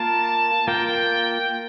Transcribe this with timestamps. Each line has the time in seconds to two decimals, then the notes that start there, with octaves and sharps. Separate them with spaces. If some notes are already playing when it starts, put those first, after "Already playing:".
Already playing: A#3 F4 A#4 A5
0.67 A#3 F4 A#4 G5